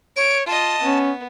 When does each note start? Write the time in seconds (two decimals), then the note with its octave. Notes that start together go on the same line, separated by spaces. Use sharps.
0.16 C#5 D7
0.47 F4 D#5 A5
0.83 B3 C#4